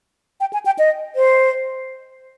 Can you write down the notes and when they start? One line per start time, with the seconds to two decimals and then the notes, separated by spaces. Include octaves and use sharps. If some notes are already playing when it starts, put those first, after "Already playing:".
0.40 G5
0.53 G#5
0.66 G5
0.79 D#5
1.16 C5